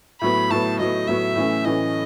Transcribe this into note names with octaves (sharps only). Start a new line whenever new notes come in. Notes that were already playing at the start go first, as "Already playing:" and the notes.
A2 F#3 B3 B5
A2 F#3 B3 A5
A2 F#3 B3 D#5
A2 F#3 B3 E5
A2 E3 A3 C#4
A2 E3 A3 C#4 D#5